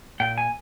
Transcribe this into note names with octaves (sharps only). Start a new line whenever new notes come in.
A#2 G5
G#5